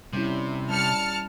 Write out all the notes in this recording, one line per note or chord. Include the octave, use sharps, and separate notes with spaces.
C3 G3 C#4 E4
G3 A5 F6 C#7